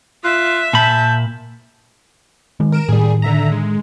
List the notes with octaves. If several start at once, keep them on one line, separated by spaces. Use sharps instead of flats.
F4 E5 F#6
A#2 A5 B5 G6
D#3 G#3
A#4 D7 E7
A2 D#3 G3 G#4
D3 E5 A#5
G#3